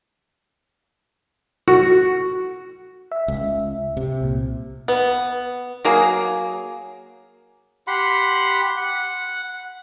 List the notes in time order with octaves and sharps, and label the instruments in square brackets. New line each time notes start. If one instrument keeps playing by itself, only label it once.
[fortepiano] F#4
[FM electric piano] E5
[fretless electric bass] C#2
C3
[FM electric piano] C2 A#2
[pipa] B3
F#3 A#3 G#4
[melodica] G4 F#5 B5 C6
F#5